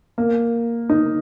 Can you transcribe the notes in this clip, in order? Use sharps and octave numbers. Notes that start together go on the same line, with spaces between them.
A#3
D#4